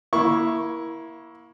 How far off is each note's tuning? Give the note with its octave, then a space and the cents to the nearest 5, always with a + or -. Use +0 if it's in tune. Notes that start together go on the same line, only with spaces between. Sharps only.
A#3 +25 E4 +0 C#6 +0